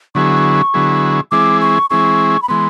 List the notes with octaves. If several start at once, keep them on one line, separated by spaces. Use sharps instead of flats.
D3 F#3 B3 E4 G#4 C#6
D3 F#3 B3 E4 G#4
E3 G#3 C4 E4 G#4 D6
C#6
E3 G#3 C4 E4 G#4 C#6
B5
E3 G#3 B3 C6